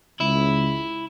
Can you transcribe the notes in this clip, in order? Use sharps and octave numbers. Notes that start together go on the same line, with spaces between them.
C#2 E4